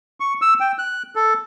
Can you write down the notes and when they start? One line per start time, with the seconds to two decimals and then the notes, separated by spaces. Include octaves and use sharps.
0.20 C#6
0.42 E6
0.60 G5
0.79 F#6
1.15 A4